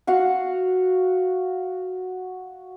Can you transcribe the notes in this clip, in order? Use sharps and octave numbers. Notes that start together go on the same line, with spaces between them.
F#4 F5 F#5